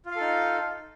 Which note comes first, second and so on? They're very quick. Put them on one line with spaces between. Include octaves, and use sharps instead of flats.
F4 F5 A4 D#4